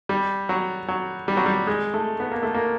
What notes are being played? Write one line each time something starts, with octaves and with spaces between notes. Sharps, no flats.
G3
F#3
F#3
G3
F#3
G3
G#3
A3
B3
A#3
A3
A#3